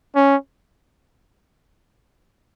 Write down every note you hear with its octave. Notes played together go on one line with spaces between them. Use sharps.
C#4